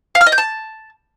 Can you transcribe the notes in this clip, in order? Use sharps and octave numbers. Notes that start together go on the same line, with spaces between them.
F5
F6
D#5
G6
A5